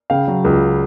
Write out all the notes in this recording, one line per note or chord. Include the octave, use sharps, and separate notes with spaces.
C#3 F5 G5
F#3
C#2